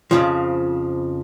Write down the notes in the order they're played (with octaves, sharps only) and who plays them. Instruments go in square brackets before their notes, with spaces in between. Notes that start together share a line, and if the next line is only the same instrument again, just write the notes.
[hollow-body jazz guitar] F2 C#3 F3